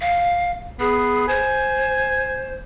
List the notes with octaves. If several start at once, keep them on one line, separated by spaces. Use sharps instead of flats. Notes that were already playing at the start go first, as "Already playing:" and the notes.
F5
B3 G#4
C5 G#5